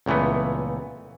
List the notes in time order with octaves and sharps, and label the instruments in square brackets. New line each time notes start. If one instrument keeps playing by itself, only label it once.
[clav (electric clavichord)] C#2 A#2 E3 A3 B3